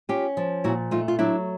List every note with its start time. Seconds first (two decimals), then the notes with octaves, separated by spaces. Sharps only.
0.09 C#4 F4 G4
0.37 F3
0.64 A#2 E4 F#4
0.91 A3 D#4 F4
1.08 F4
1.19 F#3 D4 E4